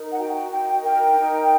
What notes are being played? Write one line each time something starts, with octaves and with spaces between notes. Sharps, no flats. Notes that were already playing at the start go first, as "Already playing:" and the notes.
Already playing: D#4 A#4
F#5
F#4 G5
D#4 G5
A#4 G5
D#4